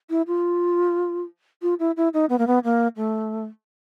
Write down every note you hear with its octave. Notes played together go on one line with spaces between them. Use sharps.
E4
F4
F4
E4
E4
D#4
B3
A#3
B3
A#3
A3